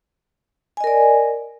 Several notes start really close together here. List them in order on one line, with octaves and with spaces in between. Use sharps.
G#5 D#5 A#4 D5